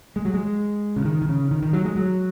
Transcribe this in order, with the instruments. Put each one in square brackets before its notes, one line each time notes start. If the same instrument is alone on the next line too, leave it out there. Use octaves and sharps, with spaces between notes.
[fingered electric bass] G#3
F#3
G#3
C#3
D#3
D#3
C#3
D#3
D#3
F#3
G#3
F#3